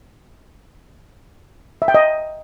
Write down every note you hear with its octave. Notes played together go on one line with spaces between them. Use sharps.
E5
G5
D#5